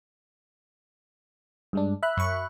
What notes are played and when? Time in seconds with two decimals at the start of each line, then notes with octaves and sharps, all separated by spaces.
1.73 G2 G#3 D4
2.03 E5 B5 F#6
2.17 F#2 C#6